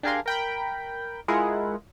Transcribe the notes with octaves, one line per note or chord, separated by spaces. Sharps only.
D4 G4 G#4 A#4 F5 C6
A#4 G5 B5
G#3 E4 F4 G#4 A#4 F#5